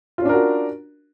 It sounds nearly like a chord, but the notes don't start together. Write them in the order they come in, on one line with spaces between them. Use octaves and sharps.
F4 C#4 D4 A#4 F#4